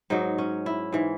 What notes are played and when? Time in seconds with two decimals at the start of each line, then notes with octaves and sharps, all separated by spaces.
0.10 G#2 F#3 D#4
0.38 C#4
0.66 E4
0.92 G#2 E3